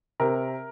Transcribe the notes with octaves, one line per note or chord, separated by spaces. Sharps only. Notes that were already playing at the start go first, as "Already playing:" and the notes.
C3 A#4